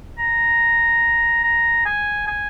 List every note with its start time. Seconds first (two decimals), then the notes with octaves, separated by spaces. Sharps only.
0.18 A#5
1.43 A#5
1.86 G#5
2.27 G#5